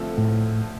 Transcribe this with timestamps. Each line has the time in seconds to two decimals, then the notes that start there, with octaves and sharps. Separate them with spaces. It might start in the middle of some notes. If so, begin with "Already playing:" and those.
Already playing: D3 F3 A3 C4
0.18 A2